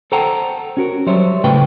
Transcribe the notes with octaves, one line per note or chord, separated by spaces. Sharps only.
A4 C5 F#5 G5 A5 A#5
C#4 F#4 A#4
F#3 G3 C5 C#5 E5
A2 C#3 A3 B4 G5